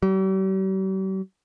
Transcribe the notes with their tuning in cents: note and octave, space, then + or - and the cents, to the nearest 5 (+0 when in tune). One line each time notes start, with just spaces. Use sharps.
G3 -45